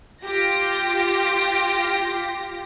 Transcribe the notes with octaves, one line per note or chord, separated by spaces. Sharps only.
F4 G4 A#6